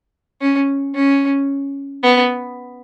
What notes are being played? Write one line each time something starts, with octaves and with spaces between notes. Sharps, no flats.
C#4
C#4
B3